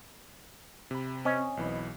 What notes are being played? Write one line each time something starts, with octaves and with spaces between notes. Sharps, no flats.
C3 B5
C4 C#4 D#5
B1 E3 B5